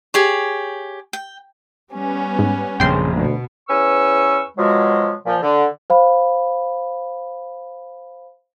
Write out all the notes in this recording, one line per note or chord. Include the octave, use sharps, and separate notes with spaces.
G4 G#4 C#5
G5
G3 B3 C#4
G#2
A#1 F#2 C#3 G5 C6
D2 B2
E2 C#4 B4 C#6 E6
B2 F3 F#3 G#3
A#2 F3
D3
C5 F5 B5